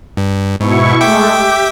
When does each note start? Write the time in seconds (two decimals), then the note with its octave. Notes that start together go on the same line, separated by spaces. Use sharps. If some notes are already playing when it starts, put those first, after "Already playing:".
0.17 G2
0.60 G#2 B2 E4 C#6
1.01 G#3 A3 E5 G5 D6
1.32 G4